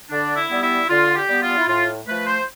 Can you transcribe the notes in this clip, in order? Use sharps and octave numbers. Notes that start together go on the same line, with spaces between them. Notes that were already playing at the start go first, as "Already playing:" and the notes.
D3 D4
E4
G3 B3
E4
D3 F4
G4
G3 B3
F4
E4
A2 F4
F3 A3 B4
C5